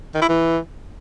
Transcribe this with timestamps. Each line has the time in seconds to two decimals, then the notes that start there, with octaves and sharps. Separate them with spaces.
0.14 D#3
0.21 E4
0.29 E3